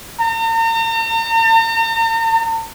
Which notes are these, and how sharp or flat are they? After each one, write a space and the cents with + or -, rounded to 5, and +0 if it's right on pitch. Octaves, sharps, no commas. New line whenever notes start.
A#5 -45